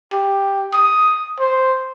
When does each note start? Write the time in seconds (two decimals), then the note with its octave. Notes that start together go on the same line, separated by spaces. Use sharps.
0.13 G4
0.73 D#6
1.39 C5